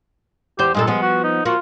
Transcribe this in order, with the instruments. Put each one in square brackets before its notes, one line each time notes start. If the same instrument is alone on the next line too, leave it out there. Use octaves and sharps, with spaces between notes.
[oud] E2 C5 [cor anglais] G4
[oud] G2 A#2 A4 [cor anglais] G#3
[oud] F3 B3 [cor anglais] G#3
[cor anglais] F#4
D#4
[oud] A#3 F#4 [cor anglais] F4